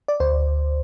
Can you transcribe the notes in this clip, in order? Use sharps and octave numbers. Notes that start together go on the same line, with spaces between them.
D5
D2 C5